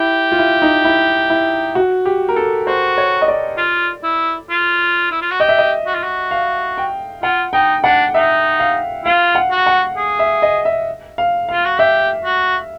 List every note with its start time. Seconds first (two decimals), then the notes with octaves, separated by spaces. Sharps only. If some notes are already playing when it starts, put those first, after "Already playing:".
Already playing: E4 G4
0.32 F4
0.38 E4
0.62 D#4
0.85 E4
1.30 E4
1.75 F#4
2.06 G4
2.29 A#4
2.36 A4
2.67 F#4 C5
2.98 C#5
3.22 D#5
3.28 D5
3.58 F4
4.03 E4
4.49 F4
5.12 E4
5.22 F4
5.31 F#4
5.40 G4 D#5
5.49 E5
5.58 D#5
5.86 F#4
5.95 F4
6.03 F#4
6.31 F5
6.78 G5
7.23 F4 F#5
7.53 D#4 G5
7.84 D4 F#5
8.14 D#4 E5
8.60 F5
9.05 F4 F5
9.35 F#5
9.51 F#4
9.66 F#5
9.97 G#4
10.19 E5
10.42 D#5
10.65 E5
11.18 F5
11.49 F4 F5
11.65 F#4
11.79 G4 E5
12.24 F#4